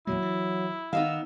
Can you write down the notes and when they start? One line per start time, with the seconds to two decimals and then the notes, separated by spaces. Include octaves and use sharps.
0.07 E2 A#2 F#3 G#3 E4
0.22 E3
0.93 D#3 B3 D#4 F5 E6